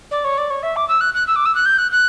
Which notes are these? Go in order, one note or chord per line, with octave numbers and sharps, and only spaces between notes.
D5
C#5
D5
C#5
E5
D6
E6
F#6
F#6
E6
D6
E6
F#6
G6
F#6
F#6